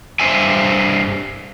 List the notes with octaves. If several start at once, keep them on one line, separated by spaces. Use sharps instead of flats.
G2 C5 E5 G#5